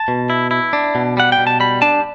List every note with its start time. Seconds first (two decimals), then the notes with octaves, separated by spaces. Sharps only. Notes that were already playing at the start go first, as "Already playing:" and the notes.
Already playing: A5
0.08 B2
0.30 E4
0.51 E4
0.73 D4
0.95 B2
1.17 G3 F#5
1.32 G5
1.38 B2
1.47 A5
1.60 G3 B5
1.82 D4 A5